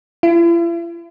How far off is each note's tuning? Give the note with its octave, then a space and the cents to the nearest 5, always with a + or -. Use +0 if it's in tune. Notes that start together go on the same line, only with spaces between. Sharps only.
E4 +45